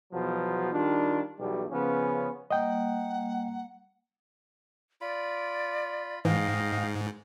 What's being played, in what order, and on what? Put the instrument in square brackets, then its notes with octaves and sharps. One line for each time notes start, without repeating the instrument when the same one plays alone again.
[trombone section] E2 B2 F3 F#3
D#3 G3 D4 F4
B1 E2 B2 G3
C#3 F3 B3 C#4
[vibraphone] G3 A#3 [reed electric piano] D#5 G5 [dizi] F#5
[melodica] F4 B5 [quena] D5
[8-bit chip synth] G#2 [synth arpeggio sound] E3 [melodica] D#5 G5 [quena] F5